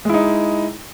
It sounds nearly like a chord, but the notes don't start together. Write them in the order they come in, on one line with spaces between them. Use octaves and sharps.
G#3 E4 D#4